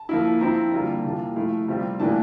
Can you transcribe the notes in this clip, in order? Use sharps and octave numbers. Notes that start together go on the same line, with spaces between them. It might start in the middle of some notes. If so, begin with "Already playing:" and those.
Already playing: A5
F3 A#3 E4
F3 C4 E4 A#5
D3 G3 A#3 F4 A#5
A5
C3 E3 A#3 F4
F3 A3 E4 F5
C3 G3 C4 F4
A2 E3 A#3 D4 A5